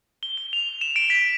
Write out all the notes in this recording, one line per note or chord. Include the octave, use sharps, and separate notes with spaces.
G7
G7
F7
E7
D7
B6